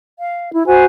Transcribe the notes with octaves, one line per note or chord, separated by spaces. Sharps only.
F5
E4
F#4 C5 G#5